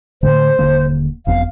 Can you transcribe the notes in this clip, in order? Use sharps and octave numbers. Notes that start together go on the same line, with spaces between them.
A2 D3 A3 C5
D#1 D3 A#3
F#1 F2 B3 F5